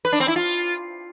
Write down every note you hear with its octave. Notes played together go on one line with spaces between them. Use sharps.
B4
D4
C4
E4
F4